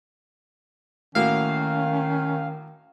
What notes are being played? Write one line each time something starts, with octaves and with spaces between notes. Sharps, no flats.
A2 D#3 A#3 C#4 F#4 F5